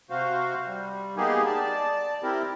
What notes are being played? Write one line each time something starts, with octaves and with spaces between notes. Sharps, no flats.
C3 F#4 C5 F5
G3
A#3 B3 D#4 G4 G#4
D5 A5
C4 E4 G4 A#4